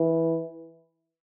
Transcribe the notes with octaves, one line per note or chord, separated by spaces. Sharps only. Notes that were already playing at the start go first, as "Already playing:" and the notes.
Already playing: E3